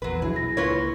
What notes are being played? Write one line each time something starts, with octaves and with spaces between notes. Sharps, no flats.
A#1 E2 F#3 B4
B1 D3 F#3 E4 G#4
B1 A#6
C#2 A#2 F4 B4 C#5